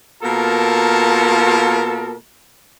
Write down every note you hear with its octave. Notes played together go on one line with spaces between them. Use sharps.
B2 A#3 F4 A4 A#4 A5